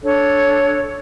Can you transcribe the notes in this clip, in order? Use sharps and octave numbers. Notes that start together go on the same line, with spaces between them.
D4 A4 C#5